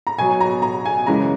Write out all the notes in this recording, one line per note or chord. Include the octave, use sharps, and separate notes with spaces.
A#5
B2 F#3 G#5
A#5
A#5
G#5
F#2 C#3 E3 G#3 A#5